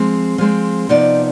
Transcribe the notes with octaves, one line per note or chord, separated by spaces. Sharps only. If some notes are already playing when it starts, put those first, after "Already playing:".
Already playing: F3 G#3 C4
F3 G#3 C4
C3 F3 B3 D#4 D5